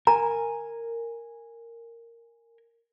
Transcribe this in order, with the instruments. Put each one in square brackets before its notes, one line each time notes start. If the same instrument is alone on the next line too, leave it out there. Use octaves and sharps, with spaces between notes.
[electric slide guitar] A#4 G#5 [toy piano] A#5